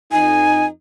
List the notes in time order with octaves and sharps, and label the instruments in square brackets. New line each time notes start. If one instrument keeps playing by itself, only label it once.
[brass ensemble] F2 D#4 [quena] G#5